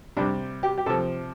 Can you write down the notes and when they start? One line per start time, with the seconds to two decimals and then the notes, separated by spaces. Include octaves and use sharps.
0.17 C3 G3 D4
0.63 G4
0.78 G4
0.86 C3 F3 A4